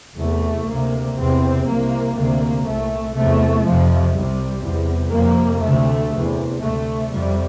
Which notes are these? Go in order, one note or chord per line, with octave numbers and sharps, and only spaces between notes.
E2 C3 A3
D2 C3 A#3
E2 C3 C4
C2 C3 A#3
D2 C3 A#3
C2 A#2 A3
E2 C3 A3
F2 C3 F3
C2 C3 G3
E2 C3
F2 C3 A#3
D2 C3 A3
E2 C3
D2 C3 A3
F2 C3 G3